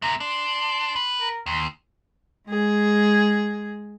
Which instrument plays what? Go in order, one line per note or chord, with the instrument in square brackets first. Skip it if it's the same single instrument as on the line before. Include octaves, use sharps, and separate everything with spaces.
[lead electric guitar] C3 A3 [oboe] A#5
[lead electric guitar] D4 [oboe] C6
[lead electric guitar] B4
[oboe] A#4
[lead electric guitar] D#2 [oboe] C6
[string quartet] G#3 G#4